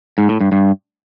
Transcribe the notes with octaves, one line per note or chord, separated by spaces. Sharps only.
G#2
A2
G2
G2